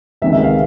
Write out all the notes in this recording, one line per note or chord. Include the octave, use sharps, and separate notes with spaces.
C#2 C3 D#3 G#3 C#4 E5
E5
F5